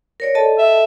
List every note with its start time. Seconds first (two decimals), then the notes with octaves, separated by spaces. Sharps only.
0.20 A#4 C#5 D5
0.35 A4 D#5 A5
0.59 E5